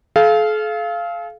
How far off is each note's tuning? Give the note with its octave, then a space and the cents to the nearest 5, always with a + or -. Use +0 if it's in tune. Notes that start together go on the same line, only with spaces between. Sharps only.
A4 -45 F5 -15